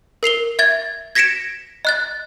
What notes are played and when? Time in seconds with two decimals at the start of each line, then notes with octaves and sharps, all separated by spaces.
0.23 A#4 C7 F7 G7
0.59 E5 G#6 A6
1.15 G#6 A#6 B6 C#7 D7 E7
1.85 D#5 F#6 A6